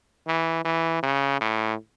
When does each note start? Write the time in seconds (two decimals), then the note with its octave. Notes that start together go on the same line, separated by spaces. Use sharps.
0.27 E3
0.65 E3
1.03 C#3
1.41 A2